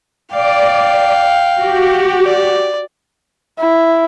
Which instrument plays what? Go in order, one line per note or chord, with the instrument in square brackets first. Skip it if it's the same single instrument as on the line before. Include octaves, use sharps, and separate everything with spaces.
[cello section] D5 [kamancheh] F5 G5
[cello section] F#4 G4
[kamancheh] D5
[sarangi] E4